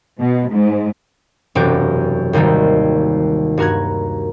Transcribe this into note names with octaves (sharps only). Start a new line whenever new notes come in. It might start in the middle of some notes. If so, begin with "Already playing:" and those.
B2
G#2
E1 F#2 C3 F#4 G4 D6
G#1 D#2 C3 D#3 G3
G2 F#4 A#4 F#6 G#6